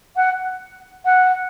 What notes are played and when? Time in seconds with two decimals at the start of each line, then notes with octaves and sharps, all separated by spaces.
0.16 F#5
1.05 F#5